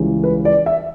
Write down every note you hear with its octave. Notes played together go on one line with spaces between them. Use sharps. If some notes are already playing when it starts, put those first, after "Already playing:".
Already playing: C#2 C#3 E3 G3
B4
D5
E5